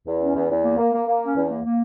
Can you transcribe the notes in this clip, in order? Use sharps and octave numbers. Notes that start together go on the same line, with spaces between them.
E2
C#4
E2
E2
A#3
A#3
A#3
A#3
C#4
E2
A#3
A#3